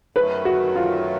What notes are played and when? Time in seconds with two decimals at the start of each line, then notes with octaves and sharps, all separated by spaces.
0.15 F#2 D#3 F#3 A3 B4
0.45 F#4
0.76 F4